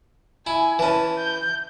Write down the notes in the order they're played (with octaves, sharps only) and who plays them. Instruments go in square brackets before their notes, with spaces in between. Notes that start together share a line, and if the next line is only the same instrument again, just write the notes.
[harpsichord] E4 [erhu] G#5
[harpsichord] E3 C#4 [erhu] A5
[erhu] G6